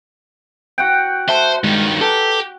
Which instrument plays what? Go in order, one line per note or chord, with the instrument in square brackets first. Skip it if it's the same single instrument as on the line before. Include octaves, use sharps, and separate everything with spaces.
[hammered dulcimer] F#4 F#5 G5
[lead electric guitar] C5 [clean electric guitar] E5 A5
[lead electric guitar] G2 D#3 [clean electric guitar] G#3
[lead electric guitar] G4 [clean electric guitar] A4 B4 A5